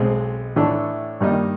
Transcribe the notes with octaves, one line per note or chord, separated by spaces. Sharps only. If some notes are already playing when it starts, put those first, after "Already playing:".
Already playing: B1 B2 G#3 C4
A2 E3 A3 D4
G2 D#3 G3 A#3 D#4